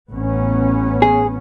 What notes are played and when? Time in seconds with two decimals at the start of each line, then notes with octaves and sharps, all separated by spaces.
0.11 A1 B3 C#4
1.02 G#4